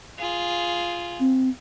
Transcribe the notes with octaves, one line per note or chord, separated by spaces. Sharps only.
F4 G#4
C4